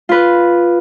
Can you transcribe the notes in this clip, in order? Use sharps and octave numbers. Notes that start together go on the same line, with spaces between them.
F4 B4